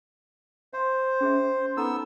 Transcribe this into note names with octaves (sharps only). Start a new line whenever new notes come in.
C5 F5
C#4 G#4 E5
B3 D#4 A4 A#5 E6